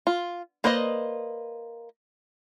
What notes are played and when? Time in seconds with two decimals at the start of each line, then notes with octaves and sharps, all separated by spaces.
0.07 F4
0.64 A#3 B4 C5 D5 D#5